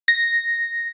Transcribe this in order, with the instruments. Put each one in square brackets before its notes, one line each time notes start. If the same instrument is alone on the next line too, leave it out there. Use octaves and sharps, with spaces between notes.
[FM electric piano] A#6